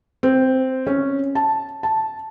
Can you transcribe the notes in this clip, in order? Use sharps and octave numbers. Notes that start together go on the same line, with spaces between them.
C4
C#4
A5
A5